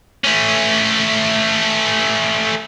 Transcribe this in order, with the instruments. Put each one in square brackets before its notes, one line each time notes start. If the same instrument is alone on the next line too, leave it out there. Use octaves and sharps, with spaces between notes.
[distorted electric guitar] A3 C#4